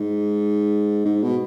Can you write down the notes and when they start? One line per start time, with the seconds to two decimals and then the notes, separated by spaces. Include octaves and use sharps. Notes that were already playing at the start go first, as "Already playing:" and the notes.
Already playing: G#2
1.05 G#2
1.23 B2